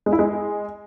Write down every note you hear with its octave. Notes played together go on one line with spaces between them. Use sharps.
G#3
E4
G#3